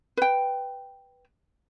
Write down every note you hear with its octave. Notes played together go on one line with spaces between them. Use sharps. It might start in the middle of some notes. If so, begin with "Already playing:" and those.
B4 G5